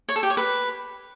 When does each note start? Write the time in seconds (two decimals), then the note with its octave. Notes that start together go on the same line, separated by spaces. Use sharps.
0.09 C#5
0.16 A4
0.23 G4
0.30 C#5
0.37 B4